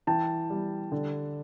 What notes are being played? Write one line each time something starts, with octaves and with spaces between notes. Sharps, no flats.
E3 G5 A5
G3
D3